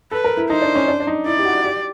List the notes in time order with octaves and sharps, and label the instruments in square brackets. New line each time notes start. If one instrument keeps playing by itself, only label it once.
[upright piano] A4 [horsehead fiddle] B4
[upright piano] A#4
E4
[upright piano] D#4 [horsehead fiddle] C5
[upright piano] D4
C#4
D4
D4
D#4
[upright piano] E4 [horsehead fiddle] D5
[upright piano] G4
F#4
G4